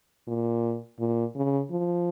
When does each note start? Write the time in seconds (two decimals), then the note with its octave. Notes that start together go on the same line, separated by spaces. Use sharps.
0.27 A#2
0.99 A#2
1.36 C#3
1.70 F3